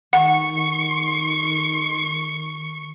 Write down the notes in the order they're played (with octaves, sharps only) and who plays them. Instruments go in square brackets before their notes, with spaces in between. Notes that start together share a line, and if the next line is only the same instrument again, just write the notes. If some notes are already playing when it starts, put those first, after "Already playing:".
[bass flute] D#3 [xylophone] F#5 [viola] C#6